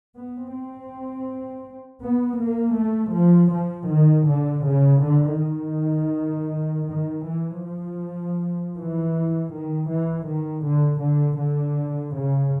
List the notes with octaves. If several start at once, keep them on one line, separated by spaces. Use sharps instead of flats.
B3
C4
B3
A#3
A3
F3
F3
D#3
D3
C#3
D3
D#3
D#3
E3
F3
E3
D#3
E3
D#3
D3
D3
D3
C#3